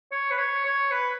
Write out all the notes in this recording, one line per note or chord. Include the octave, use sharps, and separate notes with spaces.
C#5
B4
C#5
C#5
B4